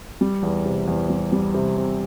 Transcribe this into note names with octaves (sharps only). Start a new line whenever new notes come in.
G3
E2
C3
E2
G3
G3
C3
C4